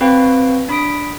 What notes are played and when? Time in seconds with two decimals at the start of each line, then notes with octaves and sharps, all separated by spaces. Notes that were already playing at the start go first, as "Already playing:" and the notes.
0.01 C4 F#4 B4 F5 G5 B5
0.69 D4 B5 D#6 B6 D7